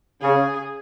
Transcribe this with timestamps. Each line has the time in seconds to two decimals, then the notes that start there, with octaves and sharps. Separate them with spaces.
0.21 C#3 G#4